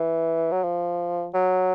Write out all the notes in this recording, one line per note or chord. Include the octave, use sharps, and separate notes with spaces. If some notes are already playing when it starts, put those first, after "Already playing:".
Already playing: E3
F#3
F3
F#3